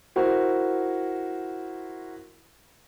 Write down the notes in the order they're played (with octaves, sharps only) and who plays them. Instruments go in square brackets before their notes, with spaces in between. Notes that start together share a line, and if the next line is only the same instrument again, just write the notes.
[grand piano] E4 F#4 A#4 C5